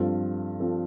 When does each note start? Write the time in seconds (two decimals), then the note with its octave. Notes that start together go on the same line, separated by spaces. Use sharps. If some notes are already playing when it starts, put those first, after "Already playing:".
Already playing: G2 F3 C4 F4 A4
0.60 F3 C4 F4 A4